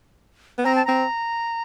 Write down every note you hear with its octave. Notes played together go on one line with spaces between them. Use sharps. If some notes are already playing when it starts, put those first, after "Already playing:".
B3
C4 A#5
A5
C4 A#5